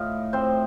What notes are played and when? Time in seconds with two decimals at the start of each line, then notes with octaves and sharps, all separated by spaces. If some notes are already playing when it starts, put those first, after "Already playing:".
Already playing: A2 F4 D#5 F5
0.33 A2 C4 C5